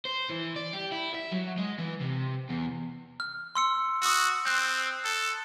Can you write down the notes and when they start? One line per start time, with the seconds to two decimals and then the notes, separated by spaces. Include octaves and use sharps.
0.05 C5
0.30 E3
0.56 D5
0.73 G4
0.92 E4
1.14 E5
1.32 F#3
1.58 G#3
1.79 E3
2.01 C3
2.49 E2
3.20 F6
3.55 C6 E6 C#7
4.02 F#4 D#6 E6
4.46 C4 F#6 G6
5.05 A4